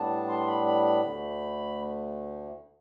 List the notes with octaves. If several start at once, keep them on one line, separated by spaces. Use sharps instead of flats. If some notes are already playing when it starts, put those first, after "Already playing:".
Already playing: A2 G3 B3 D4 A5
C6
B5
B5
B5
D2 D3 A3